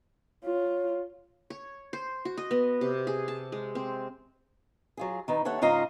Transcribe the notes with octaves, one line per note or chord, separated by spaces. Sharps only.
F4 C#5
C#5
C5
F#4
D#5
B3
C3
G#4
A5
G#3
C4
F#3 F4 G#4
D#3 D#4 B4
D#2 A4 C#5 E5 F#5
G#2 C#3 F4 D#5 F5 A#5